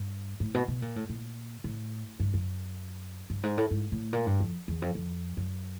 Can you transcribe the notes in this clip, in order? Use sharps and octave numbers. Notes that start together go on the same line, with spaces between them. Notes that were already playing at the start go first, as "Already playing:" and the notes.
Already playing: G2
A2
B2
B2
A#2
A2
A#2
A2
G2
F#2
G2
G#2
A2
G#2
A2
A#2
G2
F2
E2
F2
F2
F#2